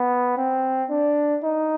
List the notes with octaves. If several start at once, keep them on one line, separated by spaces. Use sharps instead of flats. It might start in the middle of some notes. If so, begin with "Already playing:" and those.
Already playing: B3
C4
D4
D#4